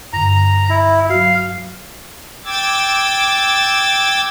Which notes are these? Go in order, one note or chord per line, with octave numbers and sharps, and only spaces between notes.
G2 D3 A#5
E4
F#3 F#4 F5
G5 D6 E6 G#6 A6